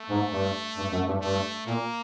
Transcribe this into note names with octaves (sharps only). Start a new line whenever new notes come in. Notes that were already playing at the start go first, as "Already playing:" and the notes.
Already playing: A3
G#2
G2
G2
F#2
G2
G2 A3
A#2 A#3